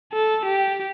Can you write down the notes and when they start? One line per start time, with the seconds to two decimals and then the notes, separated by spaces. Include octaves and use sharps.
0.12 A4
0.46 G4